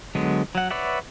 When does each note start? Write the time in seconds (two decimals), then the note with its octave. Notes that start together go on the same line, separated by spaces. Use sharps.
0.15 D3 F#3 G#3 B3
0.55 F#3 F#5
0.71 B4 C#5 D5 E5 F#5